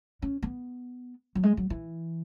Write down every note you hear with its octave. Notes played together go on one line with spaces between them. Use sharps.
C#4
B3
F#3
G#3
F#3
E3